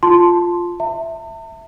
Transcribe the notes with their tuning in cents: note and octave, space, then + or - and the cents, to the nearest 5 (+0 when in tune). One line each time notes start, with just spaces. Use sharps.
F4 +0 A5 +0 C6 +0
E5 +0 A5 +45